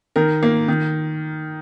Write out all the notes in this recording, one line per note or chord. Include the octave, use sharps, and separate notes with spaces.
D#3 A#4
A#3
D#3